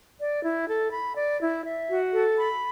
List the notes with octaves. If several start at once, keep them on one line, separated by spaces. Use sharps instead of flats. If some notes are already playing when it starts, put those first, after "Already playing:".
D5
E4
A4
B5
D5
E4
E5
F#4
A4
B5